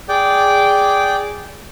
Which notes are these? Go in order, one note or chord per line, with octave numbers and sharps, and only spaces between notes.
G#4 D5 G5 D6